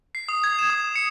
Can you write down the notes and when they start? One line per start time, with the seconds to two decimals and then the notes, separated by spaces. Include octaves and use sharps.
0.15 C7
0.29 D#6
0.44 G#6
0.58 E7
0.70 D#6
0.96 C#7